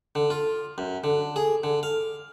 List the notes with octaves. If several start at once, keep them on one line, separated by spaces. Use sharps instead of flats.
D3
F4
F#2
D3
G#4
D3
F5